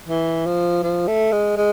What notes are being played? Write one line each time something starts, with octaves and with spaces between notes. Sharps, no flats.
E3
F3
F3
A3
G#3
G#3